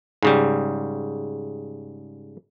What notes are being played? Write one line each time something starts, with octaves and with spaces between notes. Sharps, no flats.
G#2 C#3 G3